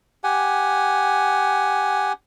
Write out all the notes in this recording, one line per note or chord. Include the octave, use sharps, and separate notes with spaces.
G4 F#5 G#5